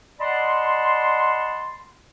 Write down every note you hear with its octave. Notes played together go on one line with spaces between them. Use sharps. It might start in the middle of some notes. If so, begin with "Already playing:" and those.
D5 D#5 F#5 A5 B5 C6